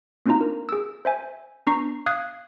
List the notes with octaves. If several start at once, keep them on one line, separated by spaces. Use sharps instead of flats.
A#3 C4 D4 D#4 F4 A#5
A#4
G#4 E6
C5 E5 G#5
B3 D4 A#5 C#6 C7
F5 D#6 F#6 G#6 C7